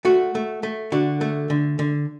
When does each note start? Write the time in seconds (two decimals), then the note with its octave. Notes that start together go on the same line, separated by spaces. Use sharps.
0.05 A3 F#4
0.35 A3
0.63 A3
0.92 D3 F#4
1.21 A3
1.50 D3
1.79 D3